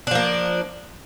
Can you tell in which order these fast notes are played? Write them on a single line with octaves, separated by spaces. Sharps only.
D4 F3 A#3